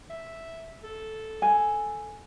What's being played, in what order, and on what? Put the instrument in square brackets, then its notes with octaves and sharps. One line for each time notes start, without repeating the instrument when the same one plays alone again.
[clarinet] E5
A4
[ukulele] G#5